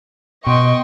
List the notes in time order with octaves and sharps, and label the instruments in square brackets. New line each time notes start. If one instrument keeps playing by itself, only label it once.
[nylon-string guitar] B2 [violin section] D#5 G5 C#6 [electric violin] C6